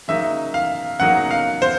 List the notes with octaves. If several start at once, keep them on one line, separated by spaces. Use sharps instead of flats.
C#3 F#3 A#3 D#4 E5
F5
C#3 F#3 A#3 D#4 F#5
F5
C5